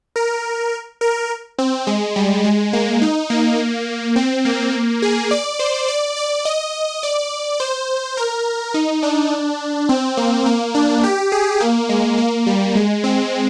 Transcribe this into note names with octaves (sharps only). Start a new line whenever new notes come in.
A#4
A#4
C4
G#3
G3
G#3
A#3
D#4
A#3
C4
A#3
G#4
D5
C5
D5
D5
D#5
D5
C5
A#4
D#4
D4
C4
A#3
A#3
D4
G4
G#4
A#3
G#3
A#3
G3
G#3
C4